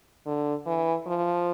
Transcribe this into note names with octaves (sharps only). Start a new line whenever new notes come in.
D3
E3
F3